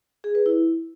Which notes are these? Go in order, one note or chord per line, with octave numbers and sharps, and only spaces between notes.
G#4
B4
E4